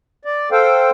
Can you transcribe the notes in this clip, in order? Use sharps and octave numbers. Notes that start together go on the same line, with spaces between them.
D5
A4 C5 F5 G5